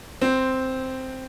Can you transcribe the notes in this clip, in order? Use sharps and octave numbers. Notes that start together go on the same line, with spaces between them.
C4